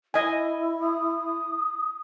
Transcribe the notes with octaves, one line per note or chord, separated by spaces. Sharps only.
E4 D#5 G#5
D#6